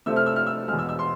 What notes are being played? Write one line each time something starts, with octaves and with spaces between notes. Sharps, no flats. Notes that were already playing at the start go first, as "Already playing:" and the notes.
C3 F3 A3 E6
F6
E6
F6
E6
E2 B2 G#3 F6
E6
E6
C6